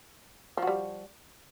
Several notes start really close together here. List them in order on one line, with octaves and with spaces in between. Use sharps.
F3 F#4 G3